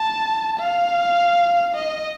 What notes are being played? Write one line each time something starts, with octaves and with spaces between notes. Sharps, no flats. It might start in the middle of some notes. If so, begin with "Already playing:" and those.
Already playing: A5
F5
D#5